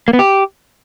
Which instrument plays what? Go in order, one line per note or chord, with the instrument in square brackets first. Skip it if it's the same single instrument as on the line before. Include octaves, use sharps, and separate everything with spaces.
[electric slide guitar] A#3
B3
G4